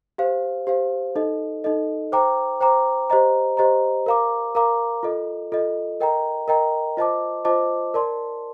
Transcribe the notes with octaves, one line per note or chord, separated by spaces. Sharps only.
G4 C5 F5
G4 C5 F5
D#4 A4 D#5
D#4 A4 D#5
C5 G5 A#5 D6
C5 G5 A#5 D6
G4 C5 D#5 A#5
G4 C5 D#5 A#5
A#4 F5 A#5 D6
A#4 F5 A#5 D6
F4 A4 D#5
F4 A4 D#5
A#4 D#5 G5 A#5
A#4 D#5 G5 A#5
F4 C5 D#5 A5 D6
F4 C5 D#5 A5 D6
A#4 D5 A5 C6